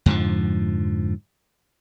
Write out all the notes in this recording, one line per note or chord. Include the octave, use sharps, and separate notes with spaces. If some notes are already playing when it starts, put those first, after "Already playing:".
F2 G#2 D3 F3